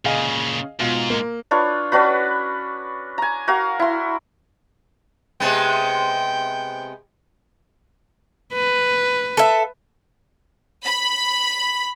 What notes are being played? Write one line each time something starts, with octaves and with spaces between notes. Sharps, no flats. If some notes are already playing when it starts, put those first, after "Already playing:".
A#2 C#3 G#4 D#5 F5
G#2 B2 F4
A#3
D4 F4 B4 C#5
C#4 D4 F#4 B4
G#5 A#5
F#4 A#4 F5
E4 C6
C3 G#3 B3 G5
B4
A4 E5
B5